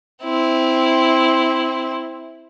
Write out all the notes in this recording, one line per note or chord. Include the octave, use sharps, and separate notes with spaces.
C4 E4